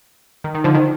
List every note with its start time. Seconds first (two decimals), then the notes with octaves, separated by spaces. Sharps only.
0.44 D#3
0.55 D#3
0.64 D3 F3
0.75 D#3